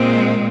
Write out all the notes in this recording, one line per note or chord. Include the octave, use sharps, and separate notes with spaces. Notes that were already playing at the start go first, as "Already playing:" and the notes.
Already playing: A#2 G#3 C4